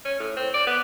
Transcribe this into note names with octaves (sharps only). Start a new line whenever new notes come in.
C#4
A2
C4
D5
B3